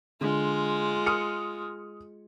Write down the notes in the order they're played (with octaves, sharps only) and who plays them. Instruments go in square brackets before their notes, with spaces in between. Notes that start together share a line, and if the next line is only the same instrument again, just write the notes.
[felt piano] D3 [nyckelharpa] G#3 F4
[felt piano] D#6 F6 C#7